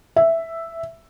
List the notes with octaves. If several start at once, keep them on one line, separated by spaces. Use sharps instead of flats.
E5